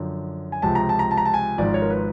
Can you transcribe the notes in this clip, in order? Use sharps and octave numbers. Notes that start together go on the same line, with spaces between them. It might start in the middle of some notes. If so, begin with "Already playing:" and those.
Already playing: F#2 D3 F3
G#5
C#2 C3 F3 A5
A#5
A5
A#5
A5
A#5
A5
G#5
G#1 G#2 F3 D5
C#5
A#4
B4